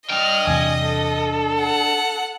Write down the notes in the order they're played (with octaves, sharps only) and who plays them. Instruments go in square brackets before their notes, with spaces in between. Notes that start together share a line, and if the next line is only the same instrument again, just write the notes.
[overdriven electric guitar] D4 G5 [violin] D#5 [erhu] F6
[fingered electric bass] E2 C3 E3 [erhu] G#5
[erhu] A4
[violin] F#5